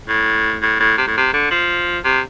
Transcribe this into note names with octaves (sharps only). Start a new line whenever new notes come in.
A2
A2
A2
C3
A2
C3
D3
F3
C3